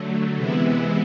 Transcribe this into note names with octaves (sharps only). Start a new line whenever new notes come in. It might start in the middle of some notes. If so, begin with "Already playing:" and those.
Already playing: D3 F#3 A3
C3 E3 G#3 B3 E4